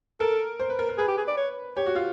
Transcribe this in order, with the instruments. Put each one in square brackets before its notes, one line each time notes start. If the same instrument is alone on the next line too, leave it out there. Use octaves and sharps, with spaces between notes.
[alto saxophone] A4 [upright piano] A#4
[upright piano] C5
B4
A#4
A#4
[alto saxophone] G#4 [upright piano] B4
[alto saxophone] G4
G#4
D5
C#5
[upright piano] G4 [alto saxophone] C#5
[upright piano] F#4
F4